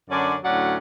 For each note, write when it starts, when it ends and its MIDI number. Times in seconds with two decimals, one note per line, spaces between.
0.10 0.35 42
0.10 0.35 50
0.10 0.35 61
0.10 0.35 62
0.10 0.35 74
0.44 0.76 38
0.44 0.76 45
0.44 0.76 54
0.44 0.76 61
0.44 0.76 74
0.44 0.76 78